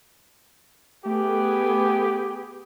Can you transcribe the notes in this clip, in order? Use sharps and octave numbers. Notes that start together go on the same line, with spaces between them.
A3 B3 G4 G#4